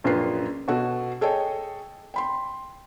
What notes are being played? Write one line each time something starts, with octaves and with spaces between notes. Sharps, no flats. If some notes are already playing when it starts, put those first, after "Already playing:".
A#1 F#2 F4 B4 C7
B2 F#4 A4
G#4 A4 C#5 D#5 G5
G5 B5 C6